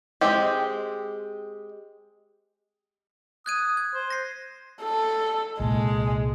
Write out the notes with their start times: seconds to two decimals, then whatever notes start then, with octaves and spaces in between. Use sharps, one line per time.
0.21 G#3 C4 G4
3.46 D#6 F#6 G#6 D#7
3.77 G#6
3.94 C5
4.10 A#6 C7
4.83 A4
5.60 C2 A#2 G#3